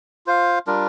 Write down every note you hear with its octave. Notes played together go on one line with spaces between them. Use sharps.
F4 C5 F5
G3 D4 F4 A#4